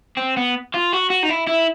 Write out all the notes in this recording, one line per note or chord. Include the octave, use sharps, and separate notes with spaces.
C4
B3
F4
F#4
F#4
D#4
E4
E4